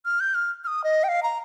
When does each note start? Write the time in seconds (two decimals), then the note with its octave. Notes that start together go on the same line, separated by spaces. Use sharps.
0.05 F6
0.20 G6
0.35 F6
0.64 F6
0.67 D#6
0.84 D#5
1.04 G5
1.09 F5
1.23 A#5